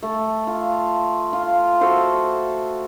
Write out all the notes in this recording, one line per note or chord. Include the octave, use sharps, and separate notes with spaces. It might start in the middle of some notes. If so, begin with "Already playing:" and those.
A3
F4
F4
F#4 A4 C5